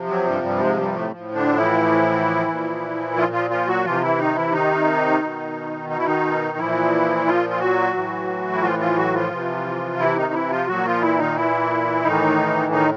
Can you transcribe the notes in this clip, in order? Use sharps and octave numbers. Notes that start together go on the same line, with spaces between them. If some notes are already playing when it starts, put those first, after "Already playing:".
Already playing: C3 F3
F#3
G2 G3
G2 G3
G#2 G#3
G2 G3
A2 A3
A2 F3
D3 D4
E3 E4
A#2 F3
F3 F4
F3 F4
F3 F4
F#3 F#4
C3 E3 F3 F4
E3 E4
D#3 D#4
E3 E4
D#3 D#4
B2
D#4
E4
D#3 D#4
A#2 E3 F3 E4
F3 F4
F4
F#3 F#4
A2 E3
E4
F3 F4
F3 F4
F#3 F#4
F3 F4
C3 E3
E3 E4
D#3 D#4
E3 E4
F3 F4
A#2 F3 F#3 F#4
F3 F4
E3 E4
D#3 D#4
E3 E4
A2 D#3 E3 D#4
D#3 D#4